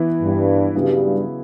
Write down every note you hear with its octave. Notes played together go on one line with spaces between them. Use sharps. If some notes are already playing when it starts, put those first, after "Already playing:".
Already playing: E3 B3 E4
G2
G2 C#3 F#3 B3 E4